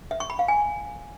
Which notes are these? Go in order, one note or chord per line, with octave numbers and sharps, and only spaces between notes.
E5
C#6
B5
F5
G#5